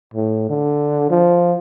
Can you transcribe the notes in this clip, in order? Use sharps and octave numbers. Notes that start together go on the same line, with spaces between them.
A2
D3
F3